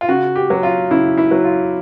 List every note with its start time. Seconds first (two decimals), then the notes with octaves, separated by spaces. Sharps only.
0.01 F4
0.09 C#3 F#4
0.36 G4
0.50 F#3
0.63 F4
0.91 C#3 E4
1.18 E4
1.31 F#3
1.44 F4